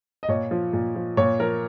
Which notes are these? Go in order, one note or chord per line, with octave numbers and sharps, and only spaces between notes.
D#5
A#2 C#5
F3
A#2
F3
A#2 C#5
F3 A#4